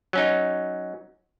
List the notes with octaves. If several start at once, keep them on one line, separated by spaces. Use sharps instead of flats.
F#3 C#4 D#4